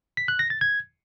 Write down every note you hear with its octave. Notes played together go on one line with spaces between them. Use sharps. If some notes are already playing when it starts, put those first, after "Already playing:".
B6
F#6
A#6
A6
G#6